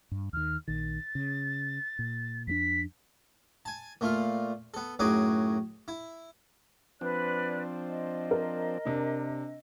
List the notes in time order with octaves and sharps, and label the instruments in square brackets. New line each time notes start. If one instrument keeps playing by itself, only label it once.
[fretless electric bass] G2
[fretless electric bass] D#2 D#3 [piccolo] F6
[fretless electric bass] A#1 D#3 [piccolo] A6
[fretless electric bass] C#3
A#2
[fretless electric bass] F2 F#3 D4 [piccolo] B6
[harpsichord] G#5 A5
A#2 A3 F4 F5
B3 A4
F#2 A2 D#4 F#4 G#4 D6
E4
[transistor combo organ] F3 C4 D4 [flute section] B4 D5 F#6
[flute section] D#5
[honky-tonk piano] A#4
[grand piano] C3 D4